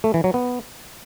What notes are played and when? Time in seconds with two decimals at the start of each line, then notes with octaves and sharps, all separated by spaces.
0.04 A3
0.14 E3
0.24 F#3
0.34 B3